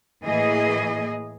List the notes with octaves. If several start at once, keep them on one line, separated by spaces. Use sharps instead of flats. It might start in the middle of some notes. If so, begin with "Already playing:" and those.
A2 E3 A#3 G#4 D#5